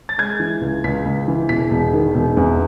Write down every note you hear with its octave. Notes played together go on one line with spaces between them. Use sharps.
A6
G#3 G#6
E3
C#2
C#2 B6
C#2
E3
E1 B6
E1
D#3
E1
E2